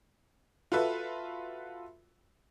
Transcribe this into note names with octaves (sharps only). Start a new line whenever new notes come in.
F4 F#4 A4 B4 E5